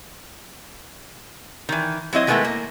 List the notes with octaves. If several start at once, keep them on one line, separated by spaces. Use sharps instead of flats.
D#3 E3
F#3 C4 E4 D#5
D#3 G#3 A3 B3 E4 A#4
A#3